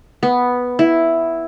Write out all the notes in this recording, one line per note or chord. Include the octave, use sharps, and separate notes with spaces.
B3
E4